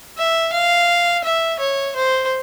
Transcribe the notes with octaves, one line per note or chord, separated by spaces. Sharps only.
E5
F5
E5
C#5
C5